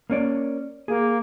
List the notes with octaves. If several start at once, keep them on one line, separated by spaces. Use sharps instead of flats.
A#3 C#4 D5
A#3 G#4